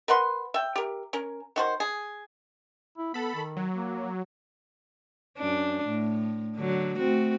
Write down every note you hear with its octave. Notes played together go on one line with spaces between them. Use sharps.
A#4 B4 F#5 C6
E5 G5
G4 A#4
C#4 A#4
D#3 F#4 C5
G#4
E4
B3 A4 B5
D#3
F#3
A#3
F#2 D4
A2
D3 F#3
A3 C4 F#4